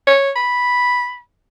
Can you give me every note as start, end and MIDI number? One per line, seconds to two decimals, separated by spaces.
0.07 0.31 73
0.36 1.20 83